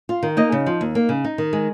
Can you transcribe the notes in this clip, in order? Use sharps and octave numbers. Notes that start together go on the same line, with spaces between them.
F4
D#3
A#3 D#4 D#5
C#3
F3
D#2
A#3
C#3
D#4
D#3
G#3